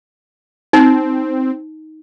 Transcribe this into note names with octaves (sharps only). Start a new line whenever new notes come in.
C4 D#4